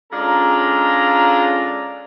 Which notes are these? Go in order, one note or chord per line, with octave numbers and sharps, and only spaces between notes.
G#3 C#4 D4 F4 A4 A#5